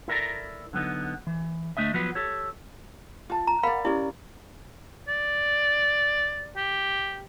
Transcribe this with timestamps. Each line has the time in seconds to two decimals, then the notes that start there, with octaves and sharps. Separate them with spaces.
0.08 E4 A4 A#4 C5 D5 A#5
0.73 D3 F#3 B3 D#4
1.27 E3
1.77 D2 A3 D4 D#5 E5
1.94 F3 F#3 B3 B4
2.15 G4 A4 C#5
3.30 F4 A5
3.47 A#5
3.63 A#4 D5 F5 F#5 B5
3.85 C#4 E4 G4 D5
5.08 D5
6.57 G4